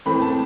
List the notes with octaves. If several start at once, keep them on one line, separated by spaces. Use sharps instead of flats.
A2 E3 A3 C4 B5
A5